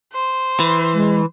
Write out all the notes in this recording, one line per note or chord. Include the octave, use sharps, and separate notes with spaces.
C5
E3
G#3